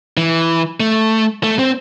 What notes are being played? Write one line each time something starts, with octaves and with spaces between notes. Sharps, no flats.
E3
A3
A3
C4